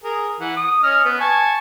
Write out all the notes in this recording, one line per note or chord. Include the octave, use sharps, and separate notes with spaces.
G#4 A#4
E3 F#5
D#6
C#4 D#5 F6
B3
G#5 A5 C#6